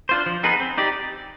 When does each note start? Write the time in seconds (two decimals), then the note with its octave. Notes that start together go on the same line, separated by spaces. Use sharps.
0.09 D4 F4 C5
0.26 F3
0.43 B3 D#4 G#4 B4
0.60 C4
0.78 D#4 G4 D5